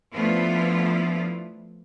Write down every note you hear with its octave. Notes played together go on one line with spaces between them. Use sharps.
F3 A3 B3 D4 E4 F4